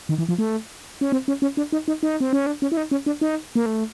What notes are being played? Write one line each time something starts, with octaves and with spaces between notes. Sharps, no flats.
D#3
E3
F3
A3
C#4
C4
C#4
C#4
D4
D#4
D#4
D#4
C4
C#4
D4
C#4
E4
D#4
C#4
D4
D#4
A#3
A3